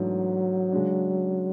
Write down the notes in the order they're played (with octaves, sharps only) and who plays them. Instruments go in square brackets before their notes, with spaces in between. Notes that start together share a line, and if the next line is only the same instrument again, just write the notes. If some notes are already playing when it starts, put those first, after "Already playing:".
Already playing: [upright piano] G#2 E3 A3 D4 [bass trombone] F#3
[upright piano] C#3 G#3 D4